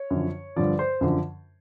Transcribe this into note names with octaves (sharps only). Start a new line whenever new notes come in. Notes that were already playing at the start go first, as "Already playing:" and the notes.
Already playing: C#5
F#2 D3 F3
G2 D3 F3 D5
C5
F#2 D3 F3